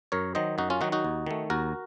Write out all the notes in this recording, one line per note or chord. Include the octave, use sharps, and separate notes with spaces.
F#2 A#4 C#5
D#3 F#3 C5 D#5
F#2 D#4 F#4
C#4 F4
D#3 F#3 D#4 F#4
D#4 F#4
D#2
D#3 A3
D#2 F#4 A#4